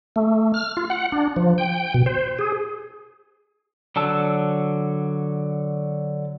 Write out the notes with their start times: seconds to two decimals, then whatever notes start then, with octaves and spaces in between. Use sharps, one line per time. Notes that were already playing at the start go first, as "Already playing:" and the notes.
0.16 A3
0.54 F6
0.77 F4
0.90 F#5
1.12 D4
1.36 F3
1.58 G5
1.94 B2
2.06 C5
2.39 G#4
3.96 D3 F#3 A5 E6